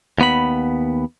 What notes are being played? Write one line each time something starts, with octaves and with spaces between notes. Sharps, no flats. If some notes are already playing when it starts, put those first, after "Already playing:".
D#2 B3 B5